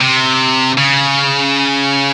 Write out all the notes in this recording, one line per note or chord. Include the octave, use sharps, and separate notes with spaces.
C3
C#3